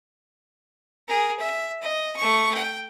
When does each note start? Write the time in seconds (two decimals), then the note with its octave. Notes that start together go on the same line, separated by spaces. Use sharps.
1.08 G#4 A#4
1.40 E5
1.83 D#5
2.17 A3 C#6
2.55 G5